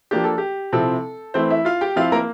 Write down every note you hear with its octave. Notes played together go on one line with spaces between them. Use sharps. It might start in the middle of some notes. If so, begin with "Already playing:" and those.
F3 A#3 D4 G4
A4
G4
C3 F3 C4 E4 A4
E3 A3 C4 E4 C5
E4 E5
F4 F5
G4 G5
F3 C4 E4 F4 F5
A#3 A#4